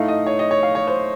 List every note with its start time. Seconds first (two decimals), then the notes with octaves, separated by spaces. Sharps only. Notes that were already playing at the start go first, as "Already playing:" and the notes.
Already playing: A2 A3 D#4 F5
0.08 D#5
0.26 C#5
0.39 D#5
0.51 C#5
0.63 F5
0.75 C#5
0.87 C5